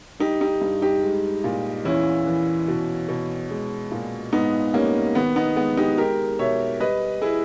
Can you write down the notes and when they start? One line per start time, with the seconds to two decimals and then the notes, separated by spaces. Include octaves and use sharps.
0.20 G3 D#4 G4
0.41 D#4 G4
0.61 G2
0.82 D#4 G4
1.03 G#3
1.44 A#2
1.85 E2 C#4 E4
2.27 E3
2.68 B2
3.09 B2
3.51 G#3
3.92 A#2
4.33 G#2 B3 D#4
4.74 G3 A#3 C#4
5.15 D#3 B3
5.36 B3 D#4
5.56 G#3 B3
5.77 D#4 G4
5.98 G#3 G4 A#4
6.39 B2 C#5 E5
6.80 G3 B4 D#5
7.22 E4 G#4